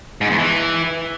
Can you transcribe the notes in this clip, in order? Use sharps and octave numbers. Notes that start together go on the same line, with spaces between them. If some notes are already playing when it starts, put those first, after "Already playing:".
G#2
E2
E3